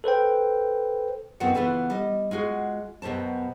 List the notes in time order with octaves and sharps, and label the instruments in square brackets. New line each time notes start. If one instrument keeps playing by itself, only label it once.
[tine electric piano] A4 B4 C5 G5
[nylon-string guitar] F#2 D#3 B3 C4 F4 F#5
C#3 E3 B3 F4 A4 B4
G3 D#5
G#3 F4 F#4 G#4
F#2 B2 G4 C5 A5